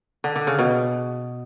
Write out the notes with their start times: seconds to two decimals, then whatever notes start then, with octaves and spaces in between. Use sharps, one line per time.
0.24 D3
0.36 D3
0.47 C#3
0.59 B2